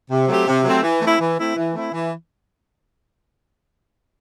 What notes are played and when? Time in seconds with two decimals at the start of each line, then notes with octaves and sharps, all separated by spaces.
0.10 C3
0.28 F#3 A3 C4 G4
0.47 C3
0.64 F#3 A3 C4 G4
0.83 E3
1.02 A3 C4 E4
1.19 E3
1.38 A3 C4 E4
1.56 E3
1.74 A3 C4 E4
1.92 E3